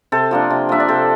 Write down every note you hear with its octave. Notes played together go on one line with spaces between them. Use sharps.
C3 A4 C5
F3 A#3 D4
C3
F3 A#3 D4 E5
D5
C3 A4 C5